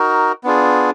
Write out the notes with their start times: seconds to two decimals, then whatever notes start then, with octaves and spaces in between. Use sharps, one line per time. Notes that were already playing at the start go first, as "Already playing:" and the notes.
Already playing: D#4 F#4 A#4
0.44 B3 D4 F4 G#4